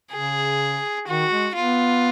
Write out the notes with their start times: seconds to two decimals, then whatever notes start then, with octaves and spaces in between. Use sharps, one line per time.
0.12 C#3 G#4
1.08 D#3 F#4
1.31 G#3
1.56 B3 F4